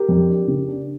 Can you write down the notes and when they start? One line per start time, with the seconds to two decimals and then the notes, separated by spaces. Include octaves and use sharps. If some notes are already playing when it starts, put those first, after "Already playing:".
Already playing: G4 A#4
0.09 F2
0.28 D4
0.47 C#3
0.68 D4